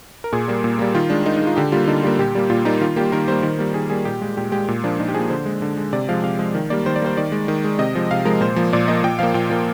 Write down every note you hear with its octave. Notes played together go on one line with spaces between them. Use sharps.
A#4
A#2 G#4
G3 A#3
A#2
G3 A#3
D#3 F4
G#3 D4
D#3 D#4
D#4
G#3
F4
D3 G4
G3 A#3 F4
D3 D#4
G3 A#3 F4
A#2 G4
G3 A#3
A#2 F4
G3 A#3 D#4
D#3 F4
G3 A#3 G4
D#3 A#4
G3 A#3 C5
D#3
G3 A#3
D#3 G#4
G3 A#3 G#4
A#2 G4
G#3
A#2 G4
G#3 G4
A#2
F3 A#3 D4
A#2 D#4
G4
F3 A#3 G#4
D3 C5
G#3
D3
G#3
C3 D5
F3 G#3 F5
C3 F5
F3 G#3
D#3
G3 A#3 D5
D#3 C5
D5
G3 A#3 C5
D#3 D5
G#3
D#3
G#3
C3 D#5
F3 G#3
C3 F5
F3 G#3 A#4
A#2 C5
F3 A#3
A#2 D5
F3 A#3 D#5
A#2 G5
F3 A#3 F5
A#2 G5
F3 A#3